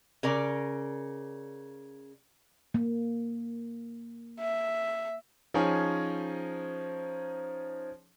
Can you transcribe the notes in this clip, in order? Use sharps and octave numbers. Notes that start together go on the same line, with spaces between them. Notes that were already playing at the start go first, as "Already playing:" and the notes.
C#3 A#4 D5
A#3
E5
F3 C#4 D#4 G#4 C#5